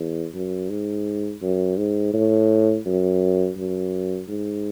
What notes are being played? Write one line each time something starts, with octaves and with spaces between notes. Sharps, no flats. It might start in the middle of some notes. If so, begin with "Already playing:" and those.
Already playing: E2
F#2
G#2
F#2
G#2
A2
F#2
F#2
G#2